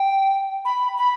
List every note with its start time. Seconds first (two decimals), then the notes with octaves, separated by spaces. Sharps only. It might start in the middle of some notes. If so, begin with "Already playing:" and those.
Already playing: G5
0.65 B5
0.97 B5